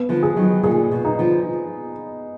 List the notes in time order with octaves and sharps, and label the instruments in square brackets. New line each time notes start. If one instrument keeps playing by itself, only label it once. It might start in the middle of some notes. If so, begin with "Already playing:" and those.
Already playing: [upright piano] B3
[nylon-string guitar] D3 F3
[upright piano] G#4
[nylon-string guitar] D#3 F#3
[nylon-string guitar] A#2 D3 [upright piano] G#4
[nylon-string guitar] B2
[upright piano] D#4
[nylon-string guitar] D3 F3